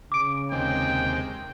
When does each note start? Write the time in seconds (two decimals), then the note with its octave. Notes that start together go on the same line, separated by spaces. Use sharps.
0.12 C#3 D6 D7
0.52 D#2 C3 G#3 G5